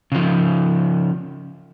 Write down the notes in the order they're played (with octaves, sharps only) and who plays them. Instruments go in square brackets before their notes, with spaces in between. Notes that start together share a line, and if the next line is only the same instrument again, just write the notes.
[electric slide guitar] C#3 F3